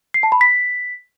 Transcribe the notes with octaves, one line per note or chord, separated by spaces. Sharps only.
C7
A5
B5
B6